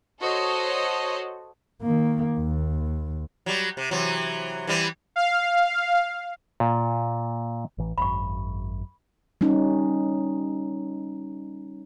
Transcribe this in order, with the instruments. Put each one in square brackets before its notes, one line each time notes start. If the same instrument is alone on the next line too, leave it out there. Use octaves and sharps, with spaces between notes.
[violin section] F#4 A4 C5 C#5 D#5
[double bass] D#3 A#3
D#2
[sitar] F#3 G3
C3
C3 E3 F#3
E3 G3 C4
[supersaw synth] F5
[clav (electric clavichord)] A#2
[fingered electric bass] A1 E3
[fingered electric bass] G#1 F#2 [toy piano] B5 C#6
[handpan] G3 C#4 D#4